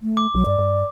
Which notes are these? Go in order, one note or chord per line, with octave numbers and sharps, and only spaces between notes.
A3
D6
B1 F#3
G2 D5
G2